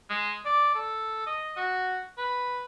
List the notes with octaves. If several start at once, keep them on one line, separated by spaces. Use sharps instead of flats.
G#3
D5
A4
D#5
F#4
B4